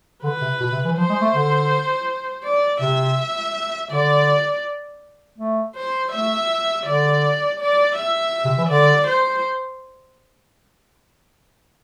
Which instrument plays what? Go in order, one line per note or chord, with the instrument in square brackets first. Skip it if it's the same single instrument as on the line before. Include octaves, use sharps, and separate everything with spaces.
[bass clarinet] D3 [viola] B4
[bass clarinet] C3
B2
C3
E3
[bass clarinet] F3 [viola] C5
[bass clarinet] G#3
A3
D3
[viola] D5
[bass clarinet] C3 [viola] E5
[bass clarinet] D3 [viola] D5
[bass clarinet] A3
[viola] C5
[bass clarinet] A3 [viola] E5
[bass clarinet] D3 [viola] D5
[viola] D5
E5
[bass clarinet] C3
E3
[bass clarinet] D3 [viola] D5
[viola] C5